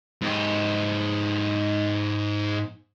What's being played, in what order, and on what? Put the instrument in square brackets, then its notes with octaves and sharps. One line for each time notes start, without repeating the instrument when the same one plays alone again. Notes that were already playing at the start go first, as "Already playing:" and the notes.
[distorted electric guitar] G#2 G4